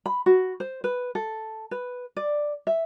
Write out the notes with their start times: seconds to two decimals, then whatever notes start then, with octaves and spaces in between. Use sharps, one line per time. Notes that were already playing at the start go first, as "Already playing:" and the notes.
0.06 B5
0.26 F#4
0.60 C5
0.84 B4
1.15 A4
1.71 B4
2.17 D5
2.67 E5